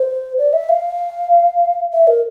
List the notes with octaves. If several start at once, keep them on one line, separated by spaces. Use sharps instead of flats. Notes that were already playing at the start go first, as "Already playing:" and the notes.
Already playing: C5
D5
E5
F5
E5
A#4